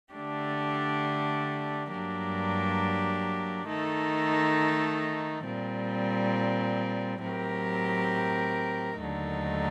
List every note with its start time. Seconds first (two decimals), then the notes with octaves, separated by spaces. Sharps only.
0.14 D3 A3 D4 G4
1.91 G2 F#3 A#3 D4 G4
3.68 D#3 A3 D#4 A4
5.46 A#2 G3 C4
7.22 A2 F#3 C4 G4 A#4
8.99 D#2 D3 F#3 A3 D#4